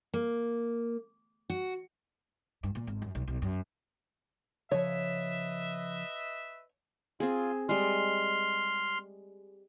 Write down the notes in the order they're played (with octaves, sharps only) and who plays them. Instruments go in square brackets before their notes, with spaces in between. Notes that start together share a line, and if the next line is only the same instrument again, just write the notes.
[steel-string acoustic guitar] A#3
F#4
[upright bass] G2
A#2
G#1
F#2
B1
B1
F#2
[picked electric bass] C#3 F3 [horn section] B4 D#5 E5 [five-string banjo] C#5
[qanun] C4 G#4 [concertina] F4
[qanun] G3 G#3 [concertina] C6 F6